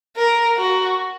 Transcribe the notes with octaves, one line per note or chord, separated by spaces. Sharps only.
A#4
F#4